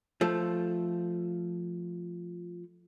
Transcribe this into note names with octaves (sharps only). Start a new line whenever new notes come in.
F3 A3